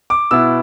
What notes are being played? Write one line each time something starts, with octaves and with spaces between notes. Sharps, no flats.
D6
B2 B3 E4 E6